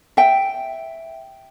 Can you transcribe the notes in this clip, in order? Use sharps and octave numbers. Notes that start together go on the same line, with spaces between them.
E5 G5